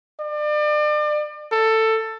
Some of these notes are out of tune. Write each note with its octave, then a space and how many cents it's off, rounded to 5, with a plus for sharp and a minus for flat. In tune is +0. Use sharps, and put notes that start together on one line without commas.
D5 +35
A4 +15